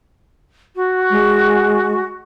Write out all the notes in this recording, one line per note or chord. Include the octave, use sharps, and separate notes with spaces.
F#4
G#3